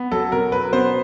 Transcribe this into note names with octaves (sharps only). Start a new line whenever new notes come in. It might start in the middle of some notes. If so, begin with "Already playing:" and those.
Already playing: B3
F#3 A4
B2 A#4
F#3 B4
B3 C5